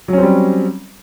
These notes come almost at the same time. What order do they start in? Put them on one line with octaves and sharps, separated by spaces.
F#3 C#4 C4 G3